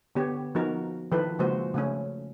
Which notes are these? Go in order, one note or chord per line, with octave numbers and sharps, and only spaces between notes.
D3 B3 G4 C#5
F3 B3 D#4 F#4 A#4
D#3 F3 E4 A4 B4
C#3 F3 G#3 A#3 F#4 C5
C#3 A3 C#4